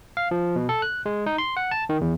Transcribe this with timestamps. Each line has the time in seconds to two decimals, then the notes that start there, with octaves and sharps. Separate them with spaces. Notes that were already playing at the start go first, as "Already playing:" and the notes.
0.17 F5
0.31 F3
0.56 B2
0.69 A4
0.82 F#6
1.06 G#3
1.26 D#4
1.38 C6
1.57 F#5
1.71 A5
1.89 D#3
2.01 E2